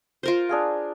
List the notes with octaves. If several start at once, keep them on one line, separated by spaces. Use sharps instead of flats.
F4 A#4 C5
D4 G#4 F5